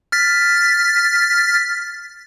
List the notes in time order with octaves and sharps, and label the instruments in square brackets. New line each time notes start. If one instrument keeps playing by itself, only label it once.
[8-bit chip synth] F6 A6 B6